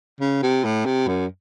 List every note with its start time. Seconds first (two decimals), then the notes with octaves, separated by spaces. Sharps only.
0.20 C#3
0.43 C3
0.65 A2
0.86 C3
1.08 F#2